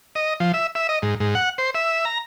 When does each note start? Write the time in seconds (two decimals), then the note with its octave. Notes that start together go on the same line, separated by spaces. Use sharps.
0.15 D#5
0.40 F3
0.54 E5
0.75 E5
0.89 D#5
1.02 G#2
1.20 G#2
1.35 F#5
1.58 C5
1.75 E5
2.05 A#5